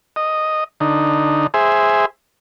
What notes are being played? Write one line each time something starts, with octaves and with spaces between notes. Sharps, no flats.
D#5
D3 D#4
G#4 C5 E5